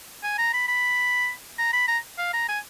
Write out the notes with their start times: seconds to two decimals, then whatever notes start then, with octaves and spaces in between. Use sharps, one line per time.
0.23 G#5
0.38 A#5
0.53 B5
0.68 B5
1.59 A#5
1.73 B5
1.88 A#5
2.18 F5
2.33 A#5
2.48 G#5